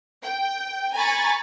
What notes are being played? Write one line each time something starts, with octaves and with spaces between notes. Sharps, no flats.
G5
G#5 A#5 B5 C#6 A6